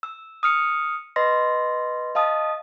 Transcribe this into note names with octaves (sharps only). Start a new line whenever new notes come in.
E6
D#6 F6 C#7
B4 D#5 C6 A#6
D#5 F5 A5 D#6